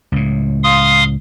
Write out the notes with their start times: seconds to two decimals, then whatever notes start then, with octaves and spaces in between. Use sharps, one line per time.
0.12 C#2 A2
0.64 F5 C6 D#6